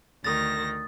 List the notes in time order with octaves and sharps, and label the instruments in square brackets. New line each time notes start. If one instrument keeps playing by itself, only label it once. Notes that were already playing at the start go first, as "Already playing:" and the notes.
[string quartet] D2 D#3 A#6 [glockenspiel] D#6 A6